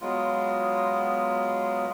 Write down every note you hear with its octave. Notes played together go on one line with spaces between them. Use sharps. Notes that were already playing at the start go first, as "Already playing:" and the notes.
F#3 G#3 B3 F4